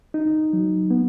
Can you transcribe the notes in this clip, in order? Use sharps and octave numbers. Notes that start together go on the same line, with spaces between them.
D#4
F#3
B3